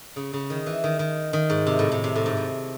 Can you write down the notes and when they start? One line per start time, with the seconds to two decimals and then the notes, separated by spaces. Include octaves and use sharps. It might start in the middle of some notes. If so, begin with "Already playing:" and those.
0.16 C#3
0.33 C#3
0.50 D#3
0.66 E3
0.84 D#3
0.99 D#3
1.33 D#3
1.50 G#2
1.67 C3
1.79 A2
1.92 A2
2.04 C3
2.15 A2
2.26 G#2
2.37 A2